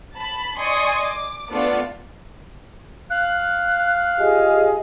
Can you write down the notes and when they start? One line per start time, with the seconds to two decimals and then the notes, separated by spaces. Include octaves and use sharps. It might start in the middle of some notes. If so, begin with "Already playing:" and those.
0.14 A5 B5
0.59 D5 D#5 G#5 C6 C#6 D#6
1.04 D6
1.50 A3 B3 D4 F4 A4 D5
3.10 F5 F#6
4.20 F4 G4 G#4 D#5